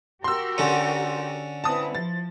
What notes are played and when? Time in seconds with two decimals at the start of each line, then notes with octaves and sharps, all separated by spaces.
0.24 F#4 G4 A#4 C6 E6
0.58 D3 C#4
1.64 C4 E4 B4 A5 D#6
1.95 F3 A6